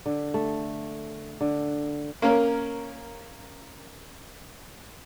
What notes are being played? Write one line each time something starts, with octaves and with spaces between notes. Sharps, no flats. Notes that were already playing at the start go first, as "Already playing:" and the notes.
D3
A3
D3
A#3 C#4 A#4